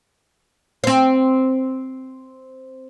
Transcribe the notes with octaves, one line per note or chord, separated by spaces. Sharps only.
C4 C5